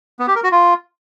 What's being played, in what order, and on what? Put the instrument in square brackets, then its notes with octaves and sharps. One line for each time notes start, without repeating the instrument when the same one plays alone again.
[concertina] B3
G4
A#4
F#4
F4